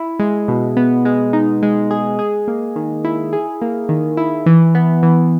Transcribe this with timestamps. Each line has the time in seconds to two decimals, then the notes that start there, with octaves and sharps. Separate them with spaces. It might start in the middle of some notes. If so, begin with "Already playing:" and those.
Already playing: E4
0.19 G#3
0.48 B2
0.77 B3
1.05 G#3
1.33 D#4
1.62 G#3
1.91 G#4
2.19 G#4
2.48 A#3
2.76 D#3
3.04 E4
3.33 G#4
3.62 A#3
3.89 D#3
4.17 E4
4.46 E3
4.75 B3
5.03 E3